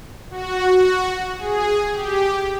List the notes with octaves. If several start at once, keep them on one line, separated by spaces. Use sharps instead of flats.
F#4
G#4
G4